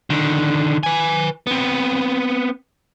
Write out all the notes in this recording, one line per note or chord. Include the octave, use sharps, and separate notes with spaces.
D3 D#3
B4 G#5
B3 C4